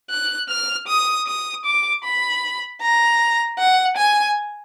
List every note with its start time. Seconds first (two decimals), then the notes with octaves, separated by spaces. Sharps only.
0.10 F#6
0.49 F6
0.88 D#6
1.27 D#6
1.65 D6
2.04 B5
2.82 A#5
3.59 F#5
3.97 G#5